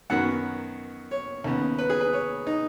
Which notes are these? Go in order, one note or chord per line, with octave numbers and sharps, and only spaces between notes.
F#2 D#3 F#3 B3 F#5
C#5
D#2 C#3 B3
B4
G#4
B4
C#5
D#4